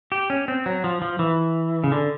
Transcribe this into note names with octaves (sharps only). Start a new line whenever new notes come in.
G4
C#4
C4
F#3
F3
F3
E3
C#3
D3